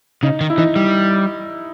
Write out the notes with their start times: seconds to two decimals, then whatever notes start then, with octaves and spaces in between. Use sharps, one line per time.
0.23 C#3 D#4
0.41 D#3
0.50 E4
0.58 E3 D#4
0.76 G3